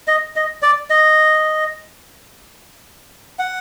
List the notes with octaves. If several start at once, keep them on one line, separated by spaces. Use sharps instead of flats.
D#5
D#5
D5
D#5
F#5